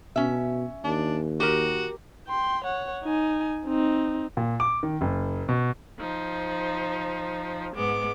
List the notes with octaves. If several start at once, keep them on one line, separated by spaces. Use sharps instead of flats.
B2 C#4 E5
D#2 D4
F#4 G4 A#4
G5 C6
C#5 F#5
D#4 G#5
C4 D#4
A#2
D6
D#3
F#1
B2
F3 D#4 C5
G#2 G#3 B3 D6